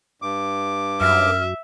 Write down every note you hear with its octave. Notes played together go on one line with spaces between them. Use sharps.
G2 D6
F#2 E5 F6